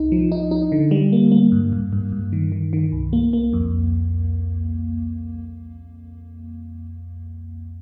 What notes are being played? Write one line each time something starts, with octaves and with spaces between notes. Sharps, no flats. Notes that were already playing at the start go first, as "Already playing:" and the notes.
Already playing: C2 D#4
F3
D#4
D#4
D3
G3
A#3
A#3
G2
G2
G2
G2
D#3
D#3
D#3
C2
A#3
A#3
F2